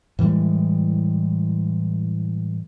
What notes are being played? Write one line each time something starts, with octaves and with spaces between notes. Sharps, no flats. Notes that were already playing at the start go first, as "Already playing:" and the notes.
A2 E3 G3 G#3